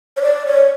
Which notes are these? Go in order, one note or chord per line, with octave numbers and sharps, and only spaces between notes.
C#5
D5
C#5